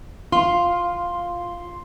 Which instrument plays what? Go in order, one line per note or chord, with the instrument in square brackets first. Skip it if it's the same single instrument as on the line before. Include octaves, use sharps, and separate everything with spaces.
[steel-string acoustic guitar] F4 [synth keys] C6